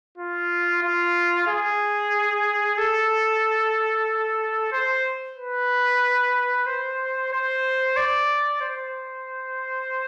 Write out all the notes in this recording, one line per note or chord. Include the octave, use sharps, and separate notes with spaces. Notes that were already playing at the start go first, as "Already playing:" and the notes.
F4
F4
G#4
A4
C5
B4
C5
C5
D5
C5